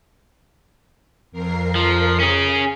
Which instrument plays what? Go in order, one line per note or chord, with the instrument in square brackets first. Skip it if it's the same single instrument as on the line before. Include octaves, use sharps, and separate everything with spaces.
[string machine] F2 A#4 C7
[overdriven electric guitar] F3
C#4 G#4